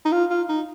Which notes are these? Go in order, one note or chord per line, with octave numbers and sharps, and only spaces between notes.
D#4
F4
F4
D#4